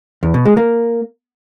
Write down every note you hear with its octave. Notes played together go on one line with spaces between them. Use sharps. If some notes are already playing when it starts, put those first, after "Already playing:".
E2
B2
G#3
A#3